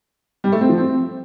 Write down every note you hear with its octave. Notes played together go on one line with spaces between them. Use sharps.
G3
A3
C4
F3
C4